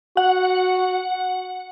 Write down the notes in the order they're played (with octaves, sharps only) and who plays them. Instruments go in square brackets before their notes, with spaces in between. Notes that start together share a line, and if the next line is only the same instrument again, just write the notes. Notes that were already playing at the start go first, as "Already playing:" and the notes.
[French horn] F#4 [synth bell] F#5